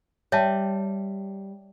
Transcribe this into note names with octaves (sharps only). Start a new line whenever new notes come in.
G3 C#5 E5 A5